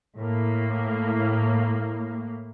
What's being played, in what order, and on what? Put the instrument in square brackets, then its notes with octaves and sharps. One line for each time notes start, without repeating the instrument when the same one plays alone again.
[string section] A2 A#3